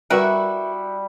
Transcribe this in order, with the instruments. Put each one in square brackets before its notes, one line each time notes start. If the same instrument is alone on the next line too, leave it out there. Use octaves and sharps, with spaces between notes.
[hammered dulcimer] G3 [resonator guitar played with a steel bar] E4 F#4 [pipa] A#4 B4 E5